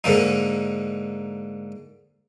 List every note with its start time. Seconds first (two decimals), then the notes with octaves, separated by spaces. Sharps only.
0.04 G#2 D3 A#3 D#4